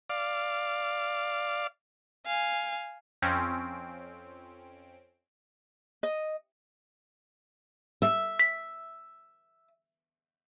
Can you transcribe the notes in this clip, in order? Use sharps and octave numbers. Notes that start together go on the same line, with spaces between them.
D5 F5
F5 G#5
F2 C4 C#4 D7
D#5
E5
B6